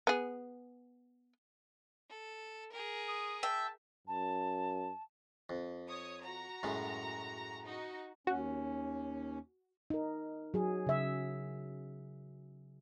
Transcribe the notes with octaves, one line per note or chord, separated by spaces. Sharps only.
B3 G#4
A4
G#4 A#4
D#6
E5 G5 A5
F#2 A5
F2
C#5 D#6
F#4 A#5
F#2 A2 G#3
D#4 F#4
D#2 C#4 F#4
D#4 A#4
F#3 G#4
C#3 E5